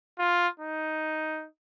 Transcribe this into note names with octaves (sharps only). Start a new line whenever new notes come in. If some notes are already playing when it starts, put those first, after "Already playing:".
F4
D#4